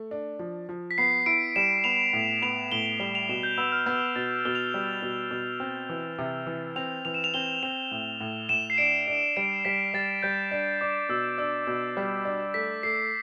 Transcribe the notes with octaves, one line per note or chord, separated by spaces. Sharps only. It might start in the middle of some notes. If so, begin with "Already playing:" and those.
Already playing: A3
D4
F3
F3
B6
B3 C7
E4 D7
G3 E7
B3 F7
A2
B3 F7
A2 G7
G7
G3 G7
F7
B2 E7
G6
B3 E6
F6
B3 G6
B2 A6
B2 G7
F7
G7
G3
B2
B2
C4
E3
C3
E3
C4 F7
E3 F7
E7
F7
C4 G7
C4 F7
A2
A2
A2 E7
C7
D4 D7
D4
G3 D7
G3 B6
G3 A6
G3 G6
D4
D4 D6
B2 E6
D4 E6
B2 G6
G3
D4
A3 B6
A3 C7